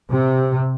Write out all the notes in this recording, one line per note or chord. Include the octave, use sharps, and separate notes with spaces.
C3